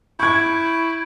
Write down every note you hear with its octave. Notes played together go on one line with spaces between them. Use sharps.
E4 C#6 G6 G#6 D7